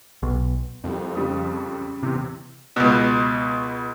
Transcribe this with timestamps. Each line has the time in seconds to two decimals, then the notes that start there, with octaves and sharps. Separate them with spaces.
0.23 B1
0.84 C2 F2 G3
1.15 C#3 G3 D#6
2.02 E2 A2 C3
2.76 C#2 B2